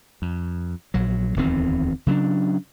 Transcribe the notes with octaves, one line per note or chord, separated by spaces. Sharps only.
F2
A#1 F#3
D1 E2 D#3 C4
C#3 F#3 A#3 D4